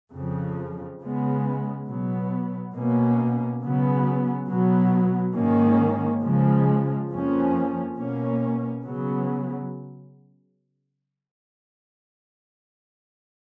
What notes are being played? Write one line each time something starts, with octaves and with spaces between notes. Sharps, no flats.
F2 C#3 F3
C#3 G#3 B3
B2 F#3 B3
B2 A#3 C#4
C#3 F#3 B3
B2 F#3 B3
G#2 D#3 A#3 C#4
C#3 F3 G#3
F2 F3 A#3 C#4
B2 A#3 C#4
C#3 F#3 B3